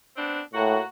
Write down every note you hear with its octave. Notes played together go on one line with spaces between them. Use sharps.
B3 C4 D4
A2 A#3 F#4